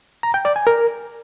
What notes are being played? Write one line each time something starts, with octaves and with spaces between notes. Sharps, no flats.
A#5
G5
D5
G#5
A#4